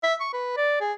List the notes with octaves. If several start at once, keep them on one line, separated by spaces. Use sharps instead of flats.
E5
C#6
B4
D5
G#4